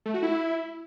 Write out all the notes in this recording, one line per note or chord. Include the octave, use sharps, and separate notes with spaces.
A3
F#4
E4